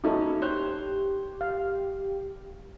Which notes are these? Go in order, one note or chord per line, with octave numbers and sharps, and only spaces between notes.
F#3 A#3 C#4 D#4 E4 A4
G4 C5 C#5 F#6
F5